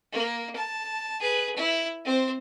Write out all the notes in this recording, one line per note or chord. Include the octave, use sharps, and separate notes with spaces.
A#3
A5
G#4 B4
E4
C4 C5